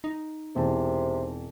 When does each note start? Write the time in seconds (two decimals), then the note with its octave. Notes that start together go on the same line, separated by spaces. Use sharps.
0.04 D#4
0.55 E1 C3 C4 A5